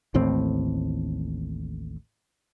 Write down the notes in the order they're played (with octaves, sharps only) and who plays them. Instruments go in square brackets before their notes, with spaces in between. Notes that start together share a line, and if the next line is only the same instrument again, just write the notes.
[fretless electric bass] A1 D#2 A2 C4